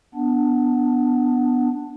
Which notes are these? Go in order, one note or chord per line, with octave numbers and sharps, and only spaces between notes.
B3 D4